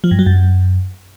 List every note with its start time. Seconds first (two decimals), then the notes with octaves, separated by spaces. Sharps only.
0.04 F3
0.11 G2
0.19 F#3
0.26 F#2